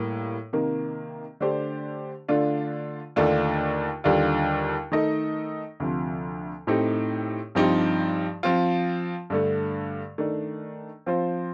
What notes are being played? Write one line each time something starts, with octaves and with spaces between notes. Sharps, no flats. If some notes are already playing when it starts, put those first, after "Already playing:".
Already playing: A2 G3 A#3
C3 D#3 A#3
D3 A3 D4 G4 C5
D3 A3 D4 F4
D#2 D3 A3 D4 F4
D#2 D3 G3 D4 F4
D#3 A3 D#4 A4 D#5
D2 C3 F3
A2 A3 C4 D#4 G4
G2 F3 C4 D#4 G4
F3 C4 F4
G2 D3 A3
D#3 A3 D4
F3 C4 F4 C5